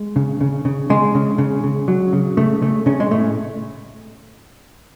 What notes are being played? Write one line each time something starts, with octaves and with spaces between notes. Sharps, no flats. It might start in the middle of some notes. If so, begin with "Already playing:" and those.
Already playing: G#3
C#3
C#3
C#3
C#3 G#3
C#3
C#3
C#3
F#3
C#3
C#3 A3
C#3 A3
C#3 C#4
G#3
A2 A3